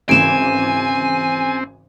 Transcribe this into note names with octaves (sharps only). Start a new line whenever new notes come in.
G#1 C#3 E3 C4 G#5 D7 E7